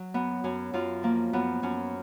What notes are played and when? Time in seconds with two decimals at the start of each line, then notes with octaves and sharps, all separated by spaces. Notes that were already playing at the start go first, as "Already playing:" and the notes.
Already playing: F#3
0.14 F#2 B3
0.44 F#2 C#4
0.73 F#2 F4
1.03 F3 A#3
1.33 F#2 B3
1.63 F#2 C#4